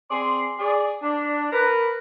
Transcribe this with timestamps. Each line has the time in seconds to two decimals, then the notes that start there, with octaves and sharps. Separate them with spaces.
0.11 C4 G#4 D5 C6
0.59 G#4 D5
1.03 D4
1.52 A#4 B4